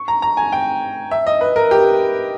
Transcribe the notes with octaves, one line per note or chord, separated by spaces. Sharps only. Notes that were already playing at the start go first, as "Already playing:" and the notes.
Already playing: C#6
A#5
A#5
G#5
G5
E5
D#5
B4
A#4
G4